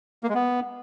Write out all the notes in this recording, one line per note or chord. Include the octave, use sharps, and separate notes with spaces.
A#3
G#3
B3